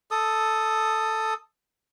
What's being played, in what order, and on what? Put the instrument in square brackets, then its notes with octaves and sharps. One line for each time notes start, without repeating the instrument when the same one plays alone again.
[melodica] A4 D#6